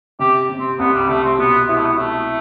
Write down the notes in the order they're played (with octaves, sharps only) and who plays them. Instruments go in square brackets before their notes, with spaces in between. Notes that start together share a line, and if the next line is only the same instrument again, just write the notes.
[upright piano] C3 [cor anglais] G4
[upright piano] C3
[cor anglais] C4
[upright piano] C2 [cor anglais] B3
[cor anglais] G3
[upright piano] C3 [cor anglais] A3
[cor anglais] C4
[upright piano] B2 [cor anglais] B3
[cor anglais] B3 [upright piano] E4
[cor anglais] A3
B3
[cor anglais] A3 [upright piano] E4